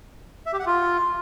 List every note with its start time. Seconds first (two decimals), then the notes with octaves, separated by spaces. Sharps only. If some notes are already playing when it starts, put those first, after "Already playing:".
0.46 E5
0.53 G4
0.60 F#5
0.66 F4